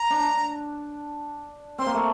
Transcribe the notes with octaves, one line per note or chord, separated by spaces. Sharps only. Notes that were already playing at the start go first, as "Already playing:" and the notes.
Already playing: A#5
D4
C4 C6
A#3
A3